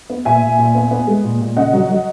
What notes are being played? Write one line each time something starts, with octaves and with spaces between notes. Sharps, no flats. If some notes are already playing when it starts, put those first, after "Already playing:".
B3
A#2 E5 G#5
A#2
A#2
B3
B3
G#3
A#2
A#2
C#3 D#5 F#5
F#3
F#3